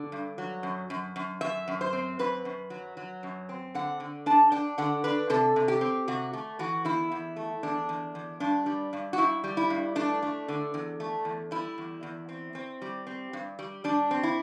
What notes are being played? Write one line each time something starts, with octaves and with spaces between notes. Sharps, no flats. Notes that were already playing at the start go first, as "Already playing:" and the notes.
Already playing: D3
G2
F#3
F#2
F#2
F#2
F#2 E5
F#2
C5
C4
F#2 B4
F#2
F#3
F#3
F#2
C4
D3 F#5
D3
D4 A5
D4 G5
D3 F#5
D4 B4
C3 A4
C3
G4
C4
C3 F#4
A3
E3 F#4
E2 E4
E2
A3
E2 D4
E2
E2
G2 D4
G3
G2
F#4
G2 E4
G3
E4
G2
A3 D4
A3
D3
E2
A3
E2
G3 E4
E2
E2
C4
C4
G3
C4
G2
G3
G3 D4
C4
E4